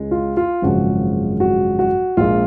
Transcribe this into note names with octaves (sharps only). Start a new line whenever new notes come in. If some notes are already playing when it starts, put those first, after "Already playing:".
Already playing: C#2 C#3 G#3
F4
F4
G#1 F#2 C#3 F3 G#3 F#4
F#4
F#4
A#1 A#2 G#3 F4